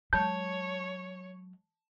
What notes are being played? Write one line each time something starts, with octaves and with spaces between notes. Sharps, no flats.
F#3 G#3 C#5 A5 G6